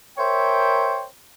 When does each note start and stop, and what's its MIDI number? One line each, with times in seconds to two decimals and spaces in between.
0.18 1.05 70
0.18 1.05 72
0.18 1.05 73
0.18 1.05 76
0.18 1.05 79